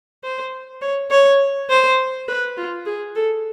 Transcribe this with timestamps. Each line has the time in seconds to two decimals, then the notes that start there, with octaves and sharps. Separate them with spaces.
0.24 C5
0.82 C#5
1.11 C#5
1.70 C5
2.28 B4
2.57 F4
2.86 G#4
3.16 A4